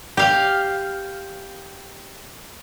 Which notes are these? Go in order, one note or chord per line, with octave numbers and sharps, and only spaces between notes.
G4 F5